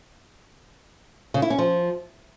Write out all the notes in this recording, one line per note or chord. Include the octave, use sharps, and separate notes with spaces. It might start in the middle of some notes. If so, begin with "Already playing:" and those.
C#3
E4
C#4
F3